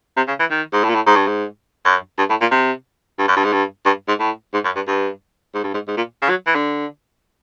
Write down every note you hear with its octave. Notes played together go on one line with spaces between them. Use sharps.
C3
C#3
E3
D#3
G#2
A2
A#2
A2
G#2
G2
G#2
F#2
G2
A2
A#2
C3
G2
F#2
G2
G#2
G2
G2
G#2
A2
G#2
F#2
G2
G2
G#2
G2
G#2
G#2
A#2
C#3
F#3
E3
D3